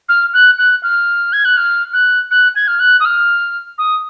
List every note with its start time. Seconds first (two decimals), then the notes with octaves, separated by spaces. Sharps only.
0.09 F6
0.34 F#6
0.58 F#6
0.83 F6
1.33 G#6
1.45 F#6
1.57 F6
1.93 F#6
2.31 F#6
2.56 G#6
2.68 F6
2.80 F#6
3.00 D#6
3.05 F6
3.78 D#6